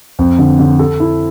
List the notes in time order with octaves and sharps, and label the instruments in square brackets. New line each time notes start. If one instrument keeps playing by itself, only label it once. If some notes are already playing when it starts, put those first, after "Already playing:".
[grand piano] F2
D3
D3
A4
E4